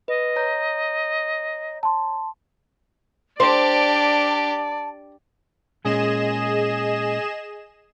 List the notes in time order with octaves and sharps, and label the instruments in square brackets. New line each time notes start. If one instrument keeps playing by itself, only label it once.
[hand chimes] B4 [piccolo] D#5
[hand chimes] C#5 A#5 G6
[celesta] A5 C6
[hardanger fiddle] D4 G4 [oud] C5 [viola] D5 [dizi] A5
[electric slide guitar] A#2 G#3 C#4 [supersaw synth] G#4 D#5 E7